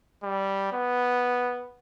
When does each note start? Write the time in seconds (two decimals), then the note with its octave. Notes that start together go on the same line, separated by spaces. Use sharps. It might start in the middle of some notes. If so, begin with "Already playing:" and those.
0.24 G3
0.73 B3